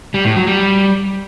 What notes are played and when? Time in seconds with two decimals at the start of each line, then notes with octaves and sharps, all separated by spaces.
0.14 G3
0.25 A2
0.36 F#3
0.47 G3